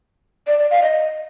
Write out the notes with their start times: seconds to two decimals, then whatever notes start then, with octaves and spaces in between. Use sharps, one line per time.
0.47 D5
0.59 D5
0.71 F5
0.82 D#5